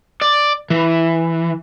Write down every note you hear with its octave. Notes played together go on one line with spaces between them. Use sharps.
D5
E3